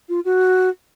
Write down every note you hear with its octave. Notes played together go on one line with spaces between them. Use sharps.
F4
F#4